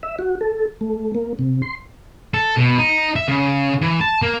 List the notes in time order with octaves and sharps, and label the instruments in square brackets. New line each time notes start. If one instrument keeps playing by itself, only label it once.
[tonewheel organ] E5
F#4
A4
A3
A#3
C3
C6
[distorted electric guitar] A4
B2
D#4
E5
C#3
E3
A5
A#3